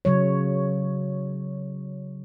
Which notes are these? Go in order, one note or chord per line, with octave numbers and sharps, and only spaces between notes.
C#3 F#3 C#5